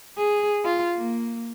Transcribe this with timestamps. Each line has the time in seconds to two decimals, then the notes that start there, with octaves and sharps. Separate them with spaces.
0.18 G#4
0.65 F4
0.96 A#3